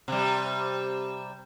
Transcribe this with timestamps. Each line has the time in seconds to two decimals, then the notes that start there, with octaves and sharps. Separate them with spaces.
0.08 C3 G3